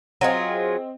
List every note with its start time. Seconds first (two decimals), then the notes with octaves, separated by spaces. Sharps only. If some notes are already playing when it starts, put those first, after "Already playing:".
0.21 F#3 C4 F4 G#4 D#5